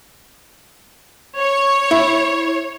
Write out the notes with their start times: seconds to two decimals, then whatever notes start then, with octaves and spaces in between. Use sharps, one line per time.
1.37 C#5
1.91 E4